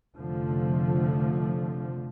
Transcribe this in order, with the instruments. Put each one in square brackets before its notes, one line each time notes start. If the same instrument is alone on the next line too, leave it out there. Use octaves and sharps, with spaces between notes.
[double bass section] F1 D3 F3 A3